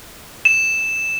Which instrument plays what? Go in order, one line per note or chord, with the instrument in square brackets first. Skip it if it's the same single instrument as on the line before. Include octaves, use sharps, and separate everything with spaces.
[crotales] E7